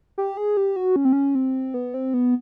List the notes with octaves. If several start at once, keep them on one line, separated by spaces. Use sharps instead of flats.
G4
G#4
G4
F#4
C#4
C4
C#4
C4
B3
C4
B3